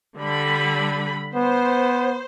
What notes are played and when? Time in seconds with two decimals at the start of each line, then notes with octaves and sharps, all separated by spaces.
0.17 D3 G3 B5
1.34 B3 C5